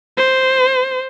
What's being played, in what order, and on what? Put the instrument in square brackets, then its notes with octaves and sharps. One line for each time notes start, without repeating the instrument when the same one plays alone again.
[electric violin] C5